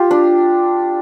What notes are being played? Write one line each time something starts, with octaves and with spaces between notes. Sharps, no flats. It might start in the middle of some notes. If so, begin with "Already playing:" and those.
Already playing: F4 G4
D4